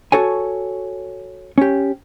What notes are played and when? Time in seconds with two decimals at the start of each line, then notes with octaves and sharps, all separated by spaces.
0.12 F#4 A4 C#5 G#5
1.58 C#4 G4